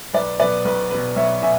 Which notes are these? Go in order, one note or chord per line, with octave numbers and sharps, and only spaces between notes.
B1 B4 D5
B2 F#3 B3 B4 D5
B1 B4
B2 F#3 B3 B4
B1 C#5 E5
B2 E5 G#5